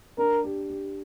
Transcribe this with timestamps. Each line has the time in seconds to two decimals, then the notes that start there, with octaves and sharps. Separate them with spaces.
0.18 D4 A#4
0.44 G4
0.70 G4